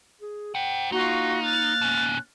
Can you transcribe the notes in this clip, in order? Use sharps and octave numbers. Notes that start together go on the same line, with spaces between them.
G#4
C5 F#5 G5
A#3 D#4 F4 F#4 C#6
F6 F#6 A6
B2 C#4